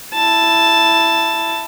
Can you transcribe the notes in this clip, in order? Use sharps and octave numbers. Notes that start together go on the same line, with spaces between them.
E4 A5